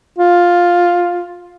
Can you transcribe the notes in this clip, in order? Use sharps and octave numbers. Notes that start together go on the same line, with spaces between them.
F4